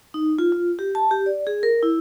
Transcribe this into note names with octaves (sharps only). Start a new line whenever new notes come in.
D#4
F4
F4
G4
A5
G4
D5
G#4
A#4
E4